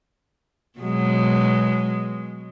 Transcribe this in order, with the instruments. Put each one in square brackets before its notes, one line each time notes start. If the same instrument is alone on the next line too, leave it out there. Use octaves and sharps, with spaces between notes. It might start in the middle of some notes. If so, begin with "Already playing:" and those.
[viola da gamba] B2 F#3 G#3